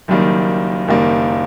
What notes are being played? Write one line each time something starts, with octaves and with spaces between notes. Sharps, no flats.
F#1 F#2 D#3 G3 A#3
F#1 F#2 D#3 G3 A#3